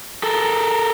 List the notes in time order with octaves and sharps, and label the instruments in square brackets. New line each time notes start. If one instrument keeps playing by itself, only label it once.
[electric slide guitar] A4 A#4